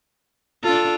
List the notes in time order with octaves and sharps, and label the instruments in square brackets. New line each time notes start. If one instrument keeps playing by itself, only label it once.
[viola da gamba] D4 F4 [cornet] A4